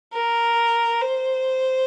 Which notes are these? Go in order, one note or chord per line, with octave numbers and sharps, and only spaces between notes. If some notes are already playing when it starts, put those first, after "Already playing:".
A#4
C5